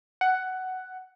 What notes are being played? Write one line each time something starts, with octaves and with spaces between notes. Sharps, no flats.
F#5